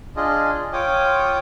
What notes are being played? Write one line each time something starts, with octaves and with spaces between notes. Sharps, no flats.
D4 F4 G#4 D#5
F4 C#5 G5 D6 D#6